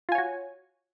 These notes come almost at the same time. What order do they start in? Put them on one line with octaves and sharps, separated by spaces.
F4 G#5 C#5 F#4